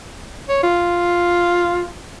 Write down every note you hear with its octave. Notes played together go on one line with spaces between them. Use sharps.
C#5
F4